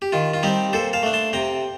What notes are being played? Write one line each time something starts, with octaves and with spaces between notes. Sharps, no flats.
G4
D#3 F4
F4
G3 C4 D#4 G4
A#2 A4 C5
F5 A5
A3 D4
A5 C6
C3 G5 A#5